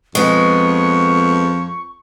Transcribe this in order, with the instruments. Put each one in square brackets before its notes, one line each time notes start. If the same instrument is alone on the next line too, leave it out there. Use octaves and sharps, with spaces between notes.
[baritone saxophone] F2 [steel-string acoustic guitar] G#3 B3 [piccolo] C#6